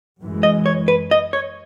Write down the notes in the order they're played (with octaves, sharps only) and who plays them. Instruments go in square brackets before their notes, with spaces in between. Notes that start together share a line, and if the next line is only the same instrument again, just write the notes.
[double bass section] F#2 E3 G#3
[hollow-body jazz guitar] D#5
C#5
B4
D#5
C#5